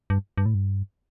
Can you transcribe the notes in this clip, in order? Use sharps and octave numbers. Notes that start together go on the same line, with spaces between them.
G2
G2
A2
G2